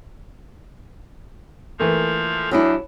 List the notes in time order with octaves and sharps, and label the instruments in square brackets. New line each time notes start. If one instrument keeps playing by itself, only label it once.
[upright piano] E3 A3 A#3 [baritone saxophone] F3
[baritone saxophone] E2 [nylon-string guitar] F#3 D4 E4